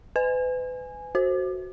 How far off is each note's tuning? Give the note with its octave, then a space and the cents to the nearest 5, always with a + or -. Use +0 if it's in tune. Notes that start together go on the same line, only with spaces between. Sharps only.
B4 +35 G#5 +0
F#4 +0 C5 +20